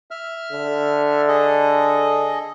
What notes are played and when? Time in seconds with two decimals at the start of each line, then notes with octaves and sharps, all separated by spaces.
0.11 E5 F6
0.51 D3
1.28 G#4 A4 D#5